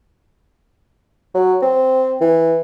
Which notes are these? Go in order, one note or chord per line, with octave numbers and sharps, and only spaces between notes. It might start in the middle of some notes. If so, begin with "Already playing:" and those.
F#3
C4
E3